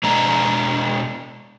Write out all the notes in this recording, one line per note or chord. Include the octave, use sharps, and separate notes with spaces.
B2 G#3 D4 D#5 A#5